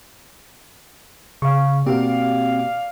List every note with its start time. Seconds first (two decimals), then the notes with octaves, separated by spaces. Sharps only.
1.42 C#3 F5 C#6
1.86 B2 A#3 C4 F#4 G4 D5 F5